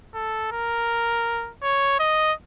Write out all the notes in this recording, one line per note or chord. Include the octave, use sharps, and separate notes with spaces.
A4
A#4
C#5
D#5